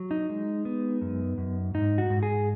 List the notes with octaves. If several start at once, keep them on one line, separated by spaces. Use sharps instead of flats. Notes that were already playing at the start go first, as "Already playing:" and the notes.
Already playing: F#3
D#4
G#3
B3
F#2
F#2
G#2 D#4
F#4
G#2
G#4